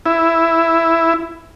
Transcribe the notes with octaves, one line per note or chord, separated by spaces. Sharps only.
E4